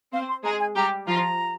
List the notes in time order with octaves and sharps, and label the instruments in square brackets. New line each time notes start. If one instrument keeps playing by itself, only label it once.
[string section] C4 C5 [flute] F5
[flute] C6
[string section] G#3 G#4 [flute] A#5
[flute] G#5
[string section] G3 G4 [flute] A#5
[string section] F3 F4 [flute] A#5